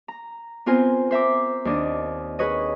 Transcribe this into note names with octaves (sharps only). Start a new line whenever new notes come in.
A#5
B3 C4 F4 A#4 C5 G#5
C5 E5 A#5 D6
D#2 D4 D#5
G#4 A#4 B4 C#5 D#5